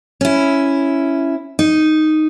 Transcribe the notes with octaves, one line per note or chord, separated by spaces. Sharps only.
C#4 E4
D#4